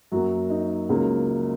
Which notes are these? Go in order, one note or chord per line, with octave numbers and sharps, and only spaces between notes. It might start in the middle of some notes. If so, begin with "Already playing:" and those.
F#2 F#3 A#3 F#4
D#4
C#2 C#3 F#3 A#3